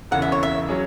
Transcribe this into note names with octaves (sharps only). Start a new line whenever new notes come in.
E1 E2 C#3 F#5
E5
C#5
E5
F#3 C#4 G#4